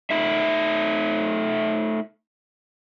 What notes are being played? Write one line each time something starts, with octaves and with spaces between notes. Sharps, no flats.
A3 D#4 E5